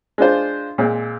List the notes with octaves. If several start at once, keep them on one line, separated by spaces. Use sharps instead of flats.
G#3 D4 F4 C5
A#2 G#3 C4